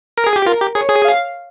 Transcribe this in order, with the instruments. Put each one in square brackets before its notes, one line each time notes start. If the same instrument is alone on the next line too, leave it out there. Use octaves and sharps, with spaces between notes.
[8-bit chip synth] A#4
G#4
G4
[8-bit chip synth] F4 [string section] A#4
[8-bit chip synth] G4
[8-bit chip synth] G#4 [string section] C#5
[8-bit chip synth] G#4
[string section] F5